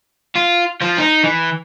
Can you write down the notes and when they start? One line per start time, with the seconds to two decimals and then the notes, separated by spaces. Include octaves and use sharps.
0.36 F4
0.81 F3 F4
0.98 D#4
1.24 E3